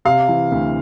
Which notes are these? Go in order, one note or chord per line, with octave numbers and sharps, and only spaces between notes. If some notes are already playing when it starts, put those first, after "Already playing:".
C3 F5
E3
D2